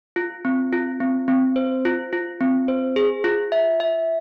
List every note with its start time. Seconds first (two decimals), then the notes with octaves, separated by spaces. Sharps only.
0.16 F4
0.45 C4
0.72 F4
1.00 C4
1.28 C4
1.56 C5
1.85 F4
2.13 F4
2.41 C4
2.68 C5
2.96 G#4
3.24 F4
3.52 E5
3.80 E5